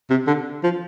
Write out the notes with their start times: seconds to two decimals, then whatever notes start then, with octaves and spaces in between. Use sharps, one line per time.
0.10 C3
0.27 D3
0.63 F3